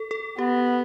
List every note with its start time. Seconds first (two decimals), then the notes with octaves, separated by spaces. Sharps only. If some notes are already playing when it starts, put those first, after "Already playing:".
Already playing: A4
0.11 A4
0.38 B3 G4